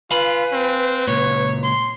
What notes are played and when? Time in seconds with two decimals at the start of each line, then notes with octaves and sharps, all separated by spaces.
0.11 F4 B4 F5 G#5 B5
0.52 C4
1.07 C#2 A#2 C#5
1.64 C6